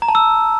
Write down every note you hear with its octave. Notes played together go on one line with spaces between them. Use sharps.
A#5
A5
E6